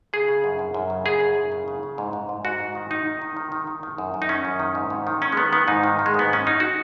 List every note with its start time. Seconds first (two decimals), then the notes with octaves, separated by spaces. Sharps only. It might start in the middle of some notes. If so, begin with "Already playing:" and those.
0.13 C#3 G#4
0.28 C#3
0.44 F#2
0.59 F#2
0.74 F#2
0.90 C#3
1.05 C#3 G#4
1.20 F#2
1.36 F#2
1.52 C#3
1.68 C#3
1.83 C#3
1.98 G#2
2.13 G#2
2.29 G#2
2.45 G#2 F#4
2.60 G#2
2.75 D#3
2.90 D#3 D#4
3.06 D#3
3.22 D#3
3.37 D#3
3.52 D#3
3.67 D#3
3.83 D#3
3.98 F#2
4.14 F#2
4.22 D#4
4.29 D#3 C#4
4.45 F#2
4.60 D#3
4.75 G#2
4.90 G#2
5.07 D#3
5.22 D#3 C#4
5.32 G#3
5.37 D#3 B3
5.53 D#3 B3
5.68 G#2 D#4
5.84 D#3
5.99 D#3
6.06 G#3
6.14 G#2 B3
6.29 D#3 C#4
6.45 D#3 D#4
6.60 F#4